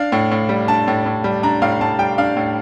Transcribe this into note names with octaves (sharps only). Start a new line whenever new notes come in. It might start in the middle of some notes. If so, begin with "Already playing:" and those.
Already playing: D4 F5
A2
A2
G3
D4 A5
A2
A2
G3
D4 A#5
A2 F5
A2 A5
G3 G5
D4 F5
A2